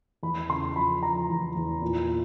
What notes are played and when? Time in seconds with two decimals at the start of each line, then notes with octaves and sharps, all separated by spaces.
0.23 E2 B5
0.50 C#3 C6
0.76 F3 B5
1.03 F3 A#5
1.29 E2
1.55 E2
1.82 A#2
2.08 A#2